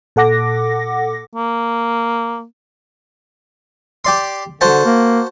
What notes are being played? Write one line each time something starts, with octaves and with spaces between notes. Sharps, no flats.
A#2 A4 F#5 D6 A#6
A#3
G4 D5 C6
D3 F#4 C5 A5
A#3